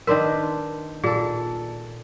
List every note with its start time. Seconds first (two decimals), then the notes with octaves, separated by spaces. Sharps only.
0.07 D#3 D4 A#4 B4 C6
1.04 A#2 G#4 A4